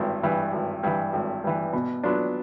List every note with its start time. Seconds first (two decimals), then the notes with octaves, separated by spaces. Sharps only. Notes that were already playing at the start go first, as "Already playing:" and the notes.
Already playing: G#1 G2 E3
0.23 G2 E3
0.53 G#1
0.83 G2 E3
1.13 G#1
1.44 G2 E3
1.73 B2
2.03 F#3 B3 D4 F4